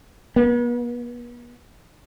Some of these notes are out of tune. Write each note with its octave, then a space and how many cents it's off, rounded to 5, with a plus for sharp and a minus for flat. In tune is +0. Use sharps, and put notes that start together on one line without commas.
B3 -40